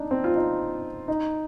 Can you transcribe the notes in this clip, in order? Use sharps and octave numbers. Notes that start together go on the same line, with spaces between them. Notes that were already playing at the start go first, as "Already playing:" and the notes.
Already playing: D4 D#4
C4
F4
D#4
D#4